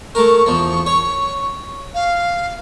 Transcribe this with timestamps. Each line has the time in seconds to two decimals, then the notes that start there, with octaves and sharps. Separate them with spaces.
0.15 A3 A#4 C#6
0.46 E2 F3
0.86 C#5
1.94 F5